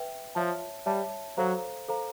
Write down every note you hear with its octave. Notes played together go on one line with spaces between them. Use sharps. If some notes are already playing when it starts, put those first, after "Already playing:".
Already playing: B4 E5 G5
F3 C#5 E5 A5
G3 C#5 E5 A5
F#3 A4 C5 F5 A#5
A4 C5 F5 A#5